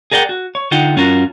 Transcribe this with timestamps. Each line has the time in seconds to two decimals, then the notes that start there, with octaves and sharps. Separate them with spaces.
0.11 G#4 A#4 D5 F#5 G5
0.29 F#4
0.55 C#5
0.71 D3 D#4 F4 F#5 G5
0.96 F#2 C#4 F4 F#4 A#4